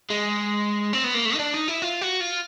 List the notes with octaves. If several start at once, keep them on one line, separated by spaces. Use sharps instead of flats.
G#3
C4
B3
A#3
A3
D#4
D4
D#4
E4
F4
F#4
F4